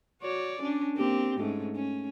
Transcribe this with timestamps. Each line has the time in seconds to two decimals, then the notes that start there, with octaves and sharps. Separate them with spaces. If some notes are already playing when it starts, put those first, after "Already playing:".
0.22 F#4 C#5 D5
0.60 C#4 D4
0.97 A#3 C4 G4
1.38 G#2 A3 C#4
1.75 C#4